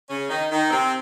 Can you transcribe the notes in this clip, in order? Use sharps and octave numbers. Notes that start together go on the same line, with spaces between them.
C#3 C#4
D#3 D#4
D#3 D#4
C3 C4